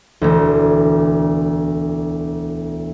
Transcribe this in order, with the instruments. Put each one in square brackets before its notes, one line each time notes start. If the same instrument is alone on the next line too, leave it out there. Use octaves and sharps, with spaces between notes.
[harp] E1 D2